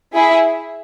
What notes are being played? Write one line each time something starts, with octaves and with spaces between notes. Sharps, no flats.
E4 G#4 E5